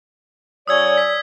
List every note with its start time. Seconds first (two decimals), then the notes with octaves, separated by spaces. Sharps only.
0.68 F#3 C#4 C#5 D5 D#6 E6 G#6
0.97 B6